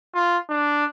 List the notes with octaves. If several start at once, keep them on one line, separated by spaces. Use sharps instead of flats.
F4
D4